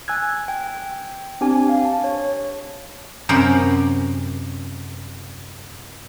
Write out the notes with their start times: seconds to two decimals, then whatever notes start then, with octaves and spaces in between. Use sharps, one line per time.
0.08 G#5 E6 F#6 G#6
0.48 G5
1.41 C4 D4 G4 G#5
1.69 F5
1.85 A5
2.04 C#5
3.29 F#2 C3 A#4 C5 B5